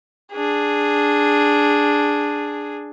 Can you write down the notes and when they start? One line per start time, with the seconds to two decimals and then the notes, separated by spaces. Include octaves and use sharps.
0.32 D4 G#4